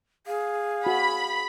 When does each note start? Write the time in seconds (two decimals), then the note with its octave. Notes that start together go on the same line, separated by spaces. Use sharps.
0.27 G#4 F5
0.86 F#4 B5